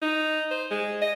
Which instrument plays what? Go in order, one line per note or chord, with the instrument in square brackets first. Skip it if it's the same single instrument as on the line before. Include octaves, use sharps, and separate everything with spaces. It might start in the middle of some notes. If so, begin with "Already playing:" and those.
[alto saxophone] D#4
C5
G#3
D#5